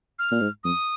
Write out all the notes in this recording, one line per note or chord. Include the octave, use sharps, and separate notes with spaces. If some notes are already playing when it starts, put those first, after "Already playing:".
F6
A#2
G#2
F2 D#6